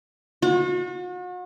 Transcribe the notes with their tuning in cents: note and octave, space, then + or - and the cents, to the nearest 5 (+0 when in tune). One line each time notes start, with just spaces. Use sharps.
F#4 -40